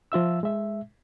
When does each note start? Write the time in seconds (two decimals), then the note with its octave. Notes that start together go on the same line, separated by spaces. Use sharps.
0.12 F3 F4 E5 E6
0.43 G#3 E5